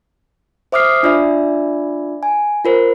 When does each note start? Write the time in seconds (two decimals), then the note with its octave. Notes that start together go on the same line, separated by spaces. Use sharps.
0.72 C5 E5 D6 D#6 F6 C7
1.03 D4 F4 D5 E5
2.23 G#5
2.65 F4 A#4 C5